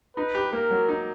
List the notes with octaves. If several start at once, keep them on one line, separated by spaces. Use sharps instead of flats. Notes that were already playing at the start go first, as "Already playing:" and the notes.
D#4 B4
G4
A#3 A#4
F#3
D#4